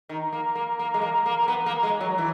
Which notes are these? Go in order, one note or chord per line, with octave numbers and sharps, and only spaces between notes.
D#3
A#3
A#3
A#3
G#3
A#3
A#3
A#3
B3
A#3
G#3
F#3
E3